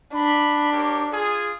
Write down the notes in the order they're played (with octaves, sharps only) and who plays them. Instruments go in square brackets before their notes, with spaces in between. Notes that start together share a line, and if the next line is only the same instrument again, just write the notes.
[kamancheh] D4 [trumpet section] B5
[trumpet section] G4 A#4 C#5
F4 G#4